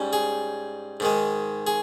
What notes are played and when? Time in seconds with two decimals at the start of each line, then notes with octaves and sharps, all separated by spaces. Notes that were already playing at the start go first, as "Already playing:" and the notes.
Already playing: G#2 G3 C#4
0.13 G#4
1.00 G#2 D#3 G#3
1.67 G#4